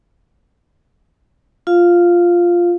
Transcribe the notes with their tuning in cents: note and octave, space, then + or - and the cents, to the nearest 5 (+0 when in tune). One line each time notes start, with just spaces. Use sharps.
F4 +0 F5 +0